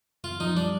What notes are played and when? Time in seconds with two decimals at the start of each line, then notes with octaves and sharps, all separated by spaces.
0.24 F#2 F4
0.40 F3 D#4
0.56 G3 D4